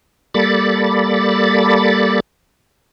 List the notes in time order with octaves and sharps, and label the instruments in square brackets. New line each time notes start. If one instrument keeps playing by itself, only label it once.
[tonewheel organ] G3 A#3 A4 D5 B5 A6